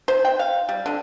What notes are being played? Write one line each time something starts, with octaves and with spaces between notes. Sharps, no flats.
C5
G5
F5
G3
D3